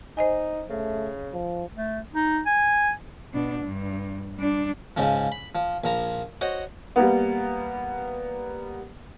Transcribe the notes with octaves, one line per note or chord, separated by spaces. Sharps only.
D#4 C5 D#5 G#5
C#3 A3
F3
A3
D#4
G#5
B2 D4
G2
G3 D4
G#2 C#3 F3
B5
F3
A#1 F3 A#5
F#4 C5 C#5 D#5
G3 A#3 B3